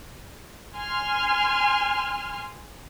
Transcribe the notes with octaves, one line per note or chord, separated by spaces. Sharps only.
G#5 C6 F6